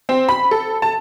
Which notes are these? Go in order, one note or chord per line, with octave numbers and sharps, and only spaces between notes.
C4
B5
A4
A5